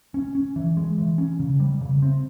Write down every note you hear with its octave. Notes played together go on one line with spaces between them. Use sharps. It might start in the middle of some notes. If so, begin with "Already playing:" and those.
C#4
C#4
E3
G#3
E3
C#4
C#3
G3
C#3
C4